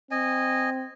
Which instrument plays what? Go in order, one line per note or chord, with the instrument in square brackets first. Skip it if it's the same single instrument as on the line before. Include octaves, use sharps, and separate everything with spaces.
[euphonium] C4 [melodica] D#5 G#5